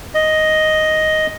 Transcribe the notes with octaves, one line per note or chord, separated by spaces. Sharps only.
D#5